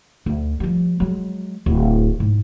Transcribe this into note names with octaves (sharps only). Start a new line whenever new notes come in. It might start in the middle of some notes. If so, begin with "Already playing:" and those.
D2
F3 G3
F#3 G#3
D1
G#2